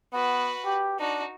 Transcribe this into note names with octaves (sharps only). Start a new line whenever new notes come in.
B3 F#4 B4
G4
D4 D#4 F#4